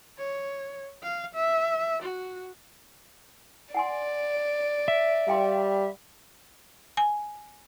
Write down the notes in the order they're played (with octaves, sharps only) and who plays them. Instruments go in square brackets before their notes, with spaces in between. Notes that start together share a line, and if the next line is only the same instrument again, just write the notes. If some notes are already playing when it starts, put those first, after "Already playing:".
[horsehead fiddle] C#5
F5
E5
F#4
[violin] D5 [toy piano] F#5 G#5 C6
[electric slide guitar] E5
[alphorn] G3 [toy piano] F5 G5 C6
[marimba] G#5